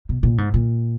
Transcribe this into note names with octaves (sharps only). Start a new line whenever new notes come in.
B2
A#2
G#2
A#2